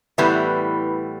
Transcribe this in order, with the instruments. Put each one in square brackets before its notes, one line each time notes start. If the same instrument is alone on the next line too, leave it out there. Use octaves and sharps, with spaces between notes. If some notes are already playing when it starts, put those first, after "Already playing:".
[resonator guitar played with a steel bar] A2 E3 G3 B3